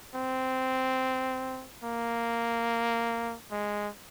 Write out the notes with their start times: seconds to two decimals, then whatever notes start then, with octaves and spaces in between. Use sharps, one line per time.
0.15 C4
1.84 A#3
3.51 G#3